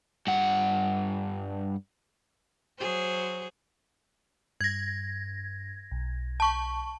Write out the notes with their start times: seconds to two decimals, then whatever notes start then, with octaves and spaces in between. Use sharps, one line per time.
0.27 G2 F#5
2.78 F#3 G#4 C5
4.61 G2 G#6 A#6
5.91 B1
6.40 A5 C#6